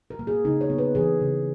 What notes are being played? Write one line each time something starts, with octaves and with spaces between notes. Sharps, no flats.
A#4
A#3
G#4
C#3 D#4
C#5
B3
B4
E3 G#4
C#3